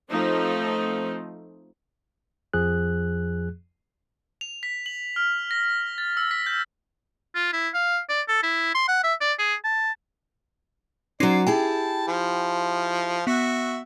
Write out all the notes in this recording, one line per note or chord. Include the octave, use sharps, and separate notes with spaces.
F3 A3 C4 D#4
F2 F3 G#4 F#6
F7
B6
F#7
F6
A#6
A6
E6
B6
G6
F4
E4
F5
D5
A4
E4
C6
F#5
E5
D5
G#4
A5
F#3 C#4 D#4 C5 D5 C7
E4 G4 G#4 G5 A5
F3
B3 F#4 E5